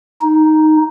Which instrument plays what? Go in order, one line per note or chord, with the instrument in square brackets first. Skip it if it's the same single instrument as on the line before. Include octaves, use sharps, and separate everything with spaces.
[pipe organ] D#4